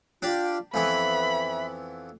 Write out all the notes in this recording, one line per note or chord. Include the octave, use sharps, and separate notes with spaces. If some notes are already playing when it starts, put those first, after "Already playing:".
D4 F4 G4 D5
F2 E3 B3 E5 B5